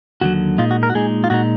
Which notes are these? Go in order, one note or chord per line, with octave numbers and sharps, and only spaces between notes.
D#2 D3 F#3 F#4
A#2 G#3 D#4 F4
F#4
A#4
F#4
A#2 G#3 D#4 G#4
F4
A#2 G#3 D#4 F#4